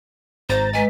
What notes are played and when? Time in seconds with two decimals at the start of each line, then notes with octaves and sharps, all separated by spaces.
0.50 G#1 C5 A#5 A6
0.73 G#3 B4 D#5 G#5